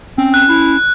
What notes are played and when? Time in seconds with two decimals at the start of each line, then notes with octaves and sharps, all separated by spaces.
0.18 C4 C#4
0.34 F#6
0.49 E4